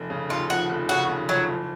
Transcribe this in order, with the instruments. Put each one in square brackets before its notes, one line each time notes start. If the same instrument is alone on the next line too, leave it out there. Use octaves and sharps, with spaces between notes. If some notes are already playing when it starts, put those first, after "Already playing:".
Already playing: [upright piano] F1
C#3
[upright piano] D#2 [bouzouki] F4
[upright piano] F3 [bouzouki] F#4
[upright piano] F1
[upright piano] C#3 [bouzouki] F#4
[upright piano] D#2
[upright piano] F3 [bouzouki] F#3
[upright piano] F#1